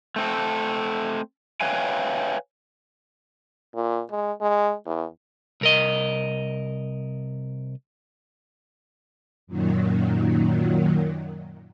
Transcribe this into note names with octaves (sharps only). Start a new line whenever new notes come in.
A3 C4 A4
B4 C#5 E5 F5 G5 G#5
A#2
G#3
G#3
E2
C2 A#4 D#5
F#2 A#2 D#3 F#3